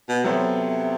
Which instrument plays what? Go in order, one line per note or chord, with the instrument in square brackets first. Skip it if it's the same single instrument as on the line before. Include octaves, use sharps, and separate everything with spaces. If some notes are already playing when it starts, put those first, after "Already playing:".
[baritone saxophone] B2
[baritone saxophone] C3 [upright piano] F#3 B3 E4 A4 C5